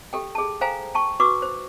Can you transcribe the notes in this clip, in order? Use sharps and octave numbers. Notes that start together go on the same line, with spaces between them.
G4 A4 G5
G#4 A5
A4 C5 F5 G5 G#5 A#5
G5 A5 C#6
F#4 B4 C#6 D6 E6
C5